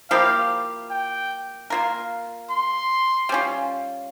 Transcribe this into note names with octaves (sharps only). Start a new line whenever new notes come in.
F3 A#3 E4 G4 F5
G5
A#3 F4 A#4
C6
G3 C#4 F4